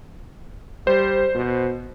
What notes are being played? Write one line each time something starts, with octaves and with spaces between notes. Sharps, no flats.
G3 C5
B2